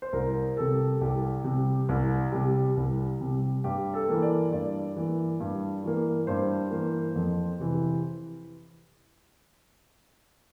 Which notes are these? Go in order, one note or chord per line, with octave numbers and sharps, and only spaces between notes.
C5
C2 A#4
C3 G3 A4
C2 G4
C3 G3
C2
C3 G3
C2
C3 G3
G2 G4
A4
E3 A#3
D5
G2 D5
E3 A#3
G2
E3 A#3
G2 C5
E3 A#3
F2
C3 E3